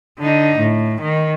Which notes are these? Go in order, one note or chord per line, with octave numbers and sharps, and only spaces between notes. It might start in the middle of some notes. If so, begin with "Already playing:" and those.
D3 D#4
A2
D#3